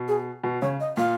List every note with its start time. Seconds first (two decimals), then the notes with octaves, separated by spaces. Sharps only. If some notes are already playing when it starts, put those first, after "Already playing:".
Already playing: B2
0.08 G#4
0.43 B2
0.62 C#3 C#5
0.80 D#5
0.97 A#2 F5